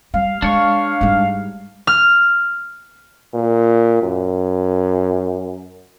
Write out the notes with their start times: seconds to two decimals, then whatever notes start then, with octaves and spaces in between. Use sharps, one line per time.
0.14 G3 F5
0.42 G#3 D4 C#5 C#6
1.01 G#2 G3
1.87 F6
3.33 A#2
4.02 F#2